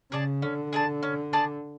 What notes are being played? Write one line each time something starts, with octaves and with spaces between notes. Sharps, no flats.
C#3 G#4 D5 A5
D3 C#4
G#4 D5 A5
C#4
G#4 D5 A5